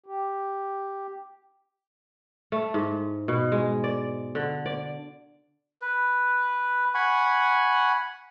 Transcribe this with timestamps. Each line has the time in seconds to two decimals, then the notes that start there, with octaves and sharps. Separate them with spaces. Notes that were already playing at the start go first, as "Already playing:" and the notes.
0.06 G4
2.52 A3
2.74 G#2
3.28 B2
3.52 G#3
3.84 D5
4.35 D3
4.66 D5
5.82 B4
6.94 F#5 G#5 B5 C#6